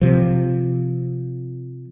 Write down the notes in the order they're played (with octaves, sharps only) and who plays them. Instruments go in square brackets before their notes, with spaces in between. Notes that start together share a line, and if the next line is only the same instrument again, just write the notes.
[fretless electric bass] C3 F3